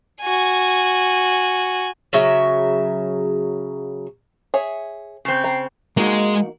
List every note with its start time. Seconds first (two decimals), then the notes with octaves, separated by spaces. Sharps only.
0.22 F#4 G#5
2.13 C#3 F#3 E5
4.54 G#4 C#5 E5
5.25 C#3 C4
5.44 G5 A#5
5.97 G#3 A#3 D#4 F#4